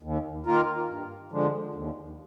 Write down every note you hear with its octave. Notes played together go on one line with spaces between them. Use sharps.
D#2
D#3 A#3 F4 A#4
G2
D3 F3 G#3 D4
D#2